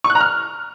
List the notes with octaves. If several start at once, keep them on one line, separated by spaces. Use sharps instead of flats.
C#6
F#6
A#5
F6